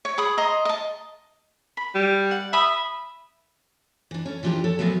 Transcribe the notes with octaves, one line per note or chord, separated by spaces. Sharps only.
C#5
G#4 B5 D#6
D#5 A#5 C6
D#5 A5
B5
G3
F#5
E5 B5 D#6
E3 D4
C#4 A4
E3 F3 D4 F4 G4 A#4
A4 C#5
A#2 F3 F#3 A3 B3